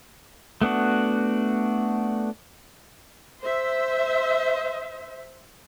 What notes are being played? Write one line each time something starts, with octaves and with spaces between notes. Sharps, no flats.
A3 B3 D4 F#4
C5 E5